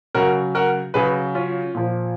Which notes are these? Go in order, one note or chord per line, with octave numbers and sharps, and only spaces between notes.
C#3 F#3 F#4 A#4
F#4 A#4
C#3 F#3 G#4 B4
C#4 F4
A#2 F3